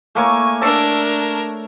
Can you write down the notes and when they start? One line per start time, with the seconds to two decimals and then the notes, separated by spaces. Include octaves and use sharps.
0.15 A3 A#3 C#5 G#5
0.61 D4 A4 A#4